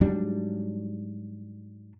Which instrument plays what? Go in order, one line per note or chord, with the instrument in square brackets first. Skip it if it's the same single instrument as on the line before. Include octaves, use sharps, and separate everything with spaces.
[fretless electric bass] G#2 F#3 G3 D4